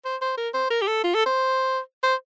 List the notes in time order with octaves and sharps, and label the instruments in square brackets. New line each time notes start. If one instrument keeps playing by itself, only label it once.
[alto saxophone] C5
C5
A#4
C5
A#4
G4
A4
F4
A4
C5
C5